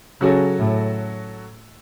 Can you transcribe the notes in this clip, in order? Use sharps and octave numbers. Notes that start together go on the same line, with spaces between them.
C#3 F#3 C#4 F#4 A4
A2